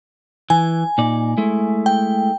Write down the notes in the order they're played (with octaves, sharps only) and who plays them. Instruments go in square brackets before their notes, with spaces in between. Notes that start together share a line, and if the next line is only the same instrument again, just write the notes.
[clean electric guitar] E3 [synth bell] G#5
[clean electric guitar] A#2 D#4 D5
G#3 A3 E4
[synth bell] G5